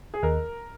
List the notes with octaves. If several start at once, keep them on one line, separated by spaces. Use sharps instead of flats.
G#4
D#2 A#4